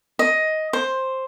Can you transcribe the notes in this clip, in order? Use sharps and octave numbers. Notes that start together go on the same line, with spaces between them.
D#5
C5